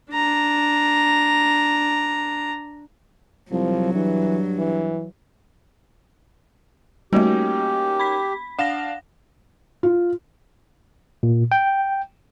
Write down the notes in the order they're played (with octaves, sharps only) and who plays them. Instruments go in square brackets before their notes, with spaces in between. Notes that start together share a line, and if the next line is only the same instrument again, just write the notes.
[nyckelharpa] D4 A#5
[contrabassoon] C2 [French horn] F3 [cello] F#3
[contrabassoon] G2 [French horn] E3
[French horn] E3
[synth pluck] G3 A3 [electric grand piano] A#3 C#4 D#4 [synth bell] F#4 [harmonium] G4
[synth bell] B5 B6
[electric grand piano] D4 F5 E7 [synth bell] F#5 A#6
[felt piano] F4
[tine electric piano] A#2
G5